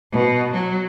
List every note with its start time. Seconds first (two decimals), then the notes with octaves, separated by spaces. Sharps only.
0.12 B2
0.53 F#3